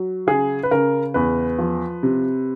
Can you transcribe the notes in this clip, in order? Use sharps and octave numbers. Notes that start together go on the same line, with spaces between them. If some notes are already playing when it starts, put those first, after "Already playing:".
Already playing: F#3
C#3 G#4
B4
C#3 A#4
E2 B4
F3
C3